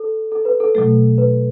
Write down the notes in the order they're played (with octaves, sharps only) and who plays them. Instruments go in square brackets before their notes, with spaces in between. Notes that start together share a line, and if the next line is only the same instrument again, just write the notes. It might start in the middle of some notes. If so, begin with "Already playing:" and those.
Already playing: [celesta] A4
A4
B4
A4
[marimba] B2 F#3 A3 [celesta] A4
[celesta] B4